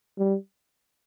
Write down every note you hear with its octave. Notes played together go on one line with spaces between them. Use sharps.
G3